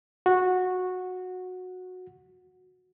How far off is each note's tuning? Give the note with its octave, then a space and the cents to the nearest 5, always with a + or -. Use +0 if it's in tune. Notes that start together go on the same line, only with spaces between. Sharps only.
F#4 -15